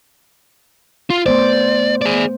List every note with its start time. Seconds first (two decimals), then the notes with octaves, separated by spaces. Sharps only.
1.10 F4
1.26 A3 B3 C5 D5
2.02 G#4 D5